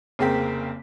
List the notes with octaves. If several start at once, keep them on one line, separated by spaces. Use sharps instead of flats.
F1 C#3 A#3 C4 B6